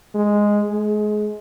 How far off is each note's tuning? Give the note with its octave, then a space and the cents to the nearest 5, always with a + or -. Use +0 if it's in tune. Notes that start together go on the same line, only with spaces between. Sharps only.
G#3 -5
G#3 +25